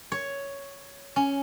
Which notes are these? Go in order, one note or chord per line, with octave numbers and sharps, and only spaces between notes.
C#5
C#4